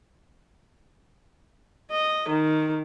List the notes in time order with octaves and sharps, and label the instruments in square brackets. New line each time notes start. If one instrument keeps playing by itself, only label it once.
[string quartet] D#5
D#3